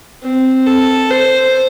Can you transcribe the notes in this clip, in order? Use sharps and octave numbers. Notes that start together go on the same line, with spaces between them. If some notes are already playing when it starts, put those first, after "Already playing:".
C4
A4
C5